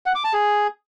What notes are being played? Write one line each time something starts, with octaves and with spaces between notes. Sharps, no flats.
F#5
D6
A5
G#4